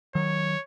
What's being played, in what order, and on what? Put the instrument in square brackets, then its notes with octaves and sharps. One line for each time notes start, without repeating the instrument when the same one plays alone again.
[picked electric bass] D#3 F#3 [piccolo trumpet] C#5